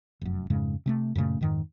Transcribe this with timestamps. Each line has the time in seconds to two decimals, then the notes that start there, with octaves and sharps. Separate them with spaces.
0.21 F1 F#2
0.50 F2 G#2 C#3 G#3
0.86 C3 G#3 A3
1.15 F#2 A#2 C#3 A3
1.41 F2 G#2 D#3